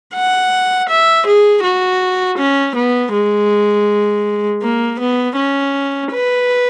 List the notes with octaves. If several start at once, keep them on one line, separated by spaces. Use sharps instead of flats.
F#5
E5
G#4
F#4
C#4
B3
G#3
A#3
B3
C#4
B4